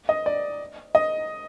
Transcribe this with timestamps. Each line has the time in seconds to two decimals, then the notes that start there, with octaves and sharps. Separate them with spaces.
0.09 D#5
0.26 D5
0.95 D#5